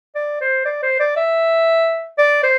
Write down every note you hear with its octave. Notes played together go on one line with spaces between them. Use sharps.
D5
C5
D5
C5
D5
E5
D5
C5